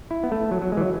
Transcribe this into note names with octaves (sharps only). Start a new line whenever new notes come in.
E4
B3
A3
F#3
F#3
G#3
E3
F#3